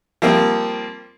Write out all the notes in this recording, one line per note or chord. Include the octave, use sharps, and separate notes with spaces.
F3 G3 A#3 C4